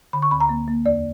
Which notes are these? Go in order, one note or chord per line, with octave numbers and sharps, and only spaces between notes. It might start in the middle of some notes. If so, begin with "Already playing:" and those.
D3 B5
C#6
D2 B5
A#5
A#3
A#3
E2 D5